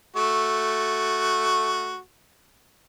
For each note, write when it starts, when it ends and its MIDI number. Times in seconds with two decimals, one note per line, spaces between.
0.16 1.99 57
0.16 1.99 66